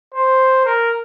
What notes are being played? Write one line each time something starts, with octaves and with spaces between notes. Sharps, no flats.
C5
A#4